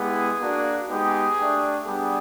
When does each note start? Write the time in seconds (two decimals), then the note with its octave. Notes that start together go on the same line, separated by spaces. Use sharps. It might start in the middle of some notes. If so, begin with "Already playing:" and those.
Already playing: G#3 B3 E4 G4 G#4
0.41 A#3 D4 F#4
0.89 G#3 B3 D#4 G4 G#4
1.38 A3 D4 G4
1.85 G3 B3 D4 G4 G#4